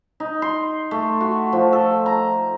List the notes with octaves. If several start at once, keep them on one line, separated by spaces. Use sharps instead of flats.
D#4
C6
A3
F#4
F3
A4
A#5